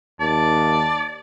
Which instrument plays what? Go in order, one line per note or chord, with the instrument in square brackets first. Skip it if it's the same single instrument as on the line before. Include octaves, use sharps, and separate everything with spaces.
[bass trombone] D#2 [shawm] D5 [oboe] A5